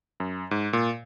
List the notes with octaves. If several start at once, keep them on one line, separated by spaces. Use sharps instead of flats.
F#2
G#2
A#2